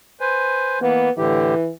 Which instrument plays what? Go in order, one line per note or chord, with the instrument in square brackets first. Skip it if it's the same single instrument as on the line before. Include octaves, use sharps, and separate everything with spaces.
[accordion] B4 C5 G#5
[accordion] E3 A#3 [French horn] B3
[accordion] A2 D3 G4 [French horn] E3